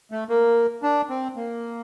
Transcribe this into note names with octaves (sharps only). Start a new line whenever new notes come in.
A3
A#3
D4
C4
A#3